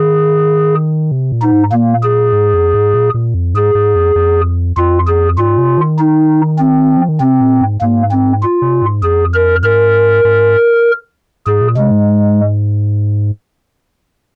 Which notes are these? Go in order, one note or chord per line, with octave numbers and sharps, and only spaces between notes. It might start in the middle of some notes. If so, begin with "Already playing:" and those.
Already playing: D#3 G#4
C3
A#2
D#4
G#2
A#2 A#3
G#4
G#2
F2
G#2
A#2
A#2
F2
G#2 G#4
G#2
F2
F2
F2 F4
G#4
G#2 F4
C3
D#3
D#4
C4
F3
D#3
C3 C4
A#2
G#2
G#2 A#3
C4
F4
C3
G#2
F2 G#4
A#4
G#2 A#4
G#2
G#2 G#4
A#2
C3 G#3
G#2